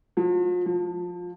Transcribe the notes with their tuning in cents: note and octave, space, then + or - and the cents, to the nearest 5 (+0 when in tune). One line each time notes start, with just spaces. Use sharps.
F3 +40
F3 +20